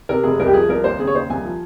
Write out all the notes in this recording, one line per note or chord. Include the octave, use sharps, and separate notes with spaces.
C3 A#4
F1 G#4
C2 A#4
G4
F3 G#4
C2 A#4
D#2 C5
C#3 G#4
C#5
D#2 C5
C2 G#5
F3